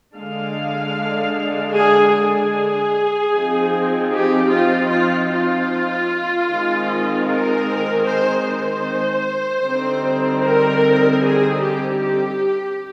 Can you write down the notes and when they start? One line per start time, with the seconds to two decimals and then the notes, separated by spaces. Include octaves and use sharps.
0.17 D3 G#3 D4 F5
1.75 G#4
2.14 G#4
3.32 F3 C4 D#4
4.11 G4
4.50 F4
4.89 F4
5.30 F4
6.48 D#3 G#3 C4 D#4
7.26 A#4
8.05 C5
8.45 C5
9.64 D3 G3 C4 D#4
10.42 A#4
11.21 G#4
11.60 G4
12.00 G4